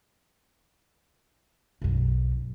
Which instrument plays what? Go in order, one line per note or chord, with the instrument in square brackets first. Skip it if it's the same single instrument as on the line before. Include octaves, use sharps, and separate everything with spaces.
[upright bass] B1 F#2